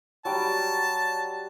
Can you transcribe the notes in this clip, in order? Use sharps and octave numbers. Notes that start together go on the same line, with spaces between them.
F#3 G3 G5 A5